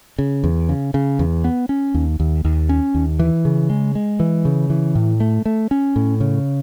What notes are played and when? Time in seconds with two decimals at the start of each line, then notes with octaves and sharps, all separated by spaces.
0.19 C#3
0.44 E2
0.69 C#3
0.94 C#3
1.19 E2
1.44 B3
1.69 C#4
1.94 D#2
2.20 D#2
2.45 D#2
2.69 C#4
2.94 D#2
3.19 E3
3.45 C#3
3.70 G#3
3.95 G#3
4.20 E3
4.45 C#3
4.70 E3
4.95 A2
5.20 A3
5.46 A3
5.71 C#4
5.96 A2
6.20 C#3